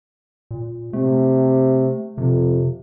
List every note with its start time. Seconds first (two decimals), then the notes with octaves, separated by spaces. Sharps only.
0.51 A#2
0.93 C3 A3
2.18 F2 C3